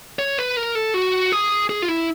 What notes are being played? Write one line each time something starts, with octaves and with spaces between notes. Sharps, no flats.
C#5
B4
A#4
A4
F#4
G#4
G#4
F4
E4